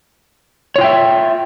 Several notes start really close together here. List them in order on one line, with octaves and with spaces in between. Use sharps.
C#5 F4 G5 E5